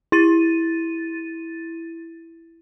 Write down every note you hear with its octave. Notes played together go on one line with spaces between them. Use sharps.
E4 A6 D#7